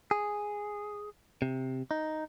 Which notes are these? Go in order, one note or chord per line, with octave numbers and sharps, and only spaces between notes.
G#4
C3
D#4